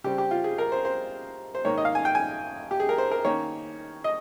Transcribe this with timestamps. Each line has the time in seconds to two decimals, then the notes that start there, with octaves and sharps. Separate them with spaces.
0.04 C#3 G3 C4 G4
0.18 G4
0.31 F4
0.44 G#4
0.58 A#4
0.72 C5
0.85 C5
1.55 C5
1.64 G#2 D#3 A#3 C#5
1.78 D#5
1.85 F5
1.95 G#5
2.05 G5
2.15 G#5
2.71 G4
2.80 G#4
2.89 A#4
2.98 C5
3.11 A#4
3.25 D#3 A#3 C#4 C#5
4.04 D#5